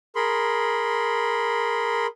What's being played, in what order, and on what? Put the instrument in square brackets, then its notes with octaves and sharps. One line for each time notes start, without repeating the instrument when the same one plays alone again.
[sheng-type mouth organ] G#4 A#4 B5 C6